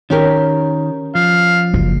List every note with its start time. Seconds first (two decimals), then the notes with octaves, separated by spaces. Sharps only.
0.10 D#3 C#4 G4 A#4
1.15 F3 F5
1.74 F#1